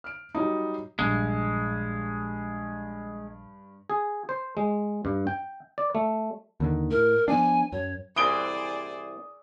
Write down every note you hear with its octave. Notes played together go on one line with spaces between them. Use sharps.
F6 D7
F#3 G3 D#4
A#1 G2 G#3
G#4
C5
G#3
G2
G5
D5
A3
D#2 D3 D#3
A2 A#4
F3 B3 D4 G#5
F#2 C#5
C2 E3 G#4 C5 D5 D#6 D7 G7